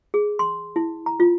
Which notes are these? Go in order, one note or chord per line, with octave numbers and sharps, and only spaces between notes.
G#4
C6
E4
A#5
F4